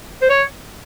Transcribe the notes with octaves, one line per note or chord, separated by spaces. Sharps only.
C5
C#5